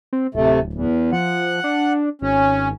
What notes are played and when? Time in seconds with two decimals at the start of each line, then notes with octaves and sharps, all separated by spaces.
0.13 C4
0.35 D1 C3 A3
0.73 E2
1.12 F3 F#5
1.64 D4
2.22 G#1 C#4